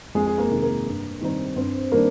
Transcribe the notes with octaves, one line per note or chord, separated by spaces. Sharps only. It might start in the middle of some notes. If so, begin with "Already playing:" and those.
F2 G#3 G#4
G#4
A#3 A#4
C3 D#3 A#3
A#3 A#4
G2
D#3 G3 C4 D#4
G2 C4 C5
D#3 G3 A#3 D4 A#4